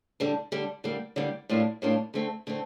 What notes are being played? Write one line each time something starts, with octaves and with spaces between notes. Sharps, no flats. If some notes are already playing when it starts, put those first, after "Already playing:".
D3 G3 D4
D3 G3 D4
D3 G3 A#3
D3 G3 A#3
A2 G3 A#3 D4 F4
A2 G3 A#3 D4 F4
D3 A3 C4
D3 A3 C4